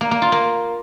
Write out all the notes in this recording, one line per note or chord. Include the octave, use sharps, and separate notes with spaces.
A#3
A#3
F4
A#3